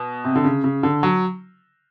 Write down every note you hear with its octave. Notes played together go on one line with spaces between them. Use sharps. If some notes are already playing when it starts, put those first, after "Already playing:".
Already playing: B2
C3
D3
C#3
C#3
D3
F#3